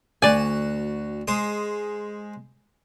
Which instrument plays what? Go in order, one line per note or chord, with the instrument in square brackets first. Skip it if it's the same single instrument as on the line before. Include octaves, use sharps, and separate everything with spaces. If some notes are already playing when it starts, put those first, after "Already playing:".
[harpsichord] D2 F#4 [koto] D5 G#5
[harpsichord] G#3 C5 D#6